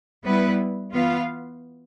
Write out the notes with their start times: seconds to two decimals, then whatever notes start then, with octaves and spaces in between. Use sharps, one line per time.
0.24 G3 B3 E4 B4
0.92 E3 B3 F4 B4 F5